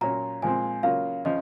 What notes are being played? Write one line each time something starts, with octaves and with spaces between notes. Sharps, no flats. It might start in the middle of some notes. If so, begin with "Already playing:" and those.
A#2 F#3 C#4 F4 A#5
A#2 F3 G#3 C4 G#5
C#3 F#3 A#3 F4 F5
C#3 F3 D#5